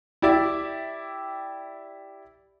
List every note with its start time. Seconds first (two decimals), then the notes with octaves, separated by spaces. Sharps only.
0.22 E4 G4 D5 E5